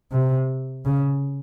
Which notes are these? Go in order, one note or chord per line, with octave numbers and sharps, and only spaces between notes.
C3
C#3